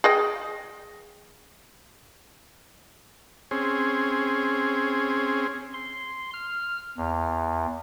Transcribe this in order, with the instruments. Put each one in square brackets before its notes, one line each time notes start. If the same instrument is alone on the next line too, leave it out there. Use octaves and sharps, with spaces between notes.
[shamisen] G#4 D#5 G5
[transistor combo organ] C4 C#4 G#4
[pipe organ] C6
F6
E2